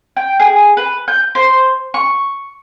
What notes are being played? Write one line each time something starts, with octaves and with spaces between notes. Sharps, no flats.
G5
G#4
B4
G6
C5
C#6